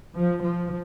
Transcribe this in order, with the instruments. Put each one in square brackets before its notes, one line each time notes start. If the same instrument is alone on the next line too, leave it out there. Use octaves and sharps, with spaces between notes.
[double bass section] F3
F3